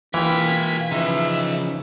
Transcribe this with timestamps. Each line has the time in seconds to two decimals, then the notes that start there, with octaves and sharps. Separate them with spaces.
0.14 E3 A#3 E4 F4 G5 G#6 B6
0.92 C#3 F3 C#4 D#4 B4 E5